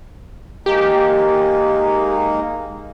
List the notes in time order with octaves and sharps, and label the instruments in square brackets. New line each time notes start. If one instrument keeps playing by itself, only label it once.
[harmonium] G#3 A#3 D#4 [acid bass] G4